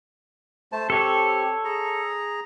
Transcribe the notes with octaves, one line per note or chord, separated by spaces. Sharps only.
A3 C5 A5
C4 G4 A4 C#5
G#4 A#5